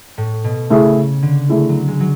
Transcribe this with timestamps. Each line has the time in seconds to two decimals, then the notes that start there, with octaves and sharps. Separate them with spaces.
0.18 A2
0.44 B2
0.70 C#3 A3 E4 G#4
1.22 D3
1.49 A3 E4 G#4
1.69 F#3
1.88 G#3
2.00 F#3